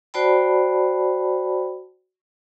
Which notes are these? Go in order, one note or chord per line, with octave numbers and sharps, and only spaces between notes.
F#4 C5 D5 G5 A5 B5